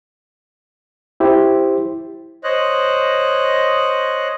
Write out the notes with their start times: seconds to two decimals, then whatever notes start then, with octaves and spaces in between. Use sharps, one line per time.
1.20 E4 G4 C5
2.44 C5 C#5 D#5 F#6